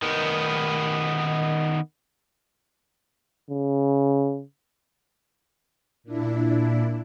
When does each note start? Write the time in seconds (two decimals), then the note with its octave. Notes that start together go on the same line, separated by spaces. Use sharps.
0.02 D#3 B3
3.50 C#3
6.04 A#2 D4 E4